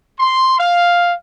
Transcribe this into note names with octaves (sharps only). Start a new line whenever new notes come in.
C6
F5